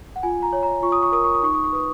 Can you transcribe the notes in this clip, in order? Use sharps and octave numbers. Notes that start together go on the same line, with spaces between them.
F#5
F4 G#5
A#5
C#5
A#5
F4 C#6
D#6
C#6
A#4 D#6
C#6
D#6
D#4 C#6
D#6
C#6
B4 D#6